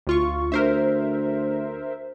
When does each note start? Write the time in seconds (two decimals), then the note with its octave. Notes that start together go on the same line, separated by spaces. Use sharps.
0.07 D2 F4 C#6
0.52 D2 A#4 C5 E5